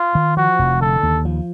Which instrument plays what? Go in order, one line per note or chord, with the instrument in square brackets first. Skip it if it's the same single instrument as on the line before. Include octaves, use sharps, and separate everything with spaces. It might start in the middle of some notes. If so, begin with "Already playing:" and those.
Already playing: [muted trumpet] F4
[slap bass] D#3
[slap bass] F3 [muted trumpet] F#4
[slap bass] F1
[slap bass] D3 [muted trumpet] A4
[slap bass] D#2
F3